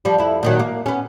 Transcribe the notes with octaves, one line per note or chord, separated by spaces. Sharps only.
F3 G3
F2 E4
A#2 D#3 F#3
A#3
B3 C#4